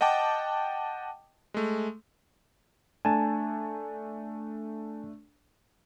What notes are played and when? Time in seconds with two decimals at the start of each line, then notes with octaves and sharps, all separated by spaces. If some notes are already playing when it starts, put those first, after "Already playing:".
0.01 D#5 F#5 G5 A5 D6
1.54 G#3 A3
3.05 A3 D4 G#5 A5